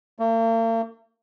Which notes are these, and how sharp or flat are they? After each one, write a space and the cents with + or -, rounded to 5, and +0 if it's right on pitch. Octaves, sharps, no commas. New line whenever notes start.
A#3 -45